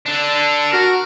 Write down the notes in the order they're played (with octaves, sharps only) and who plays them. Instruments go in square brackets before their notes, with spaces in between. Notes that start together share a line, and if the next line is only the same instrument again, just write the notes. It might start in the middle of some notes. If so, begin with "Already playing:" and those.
[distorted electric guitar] D4 A4
[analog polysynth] F#4 [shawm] A#4